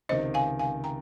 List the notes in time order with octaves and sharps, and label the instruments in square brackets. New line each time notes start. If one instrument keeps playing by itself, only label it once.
[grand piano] C#2 C3 D#3 [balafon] C5 D#5
[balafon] F5 G#5
F5 G#5
G5 A#5